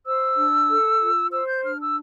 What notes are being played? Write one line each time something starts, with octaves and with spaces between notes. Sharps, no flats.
C5 E6
D4
A4
F4
C5 E6
G6
D4 F6
E6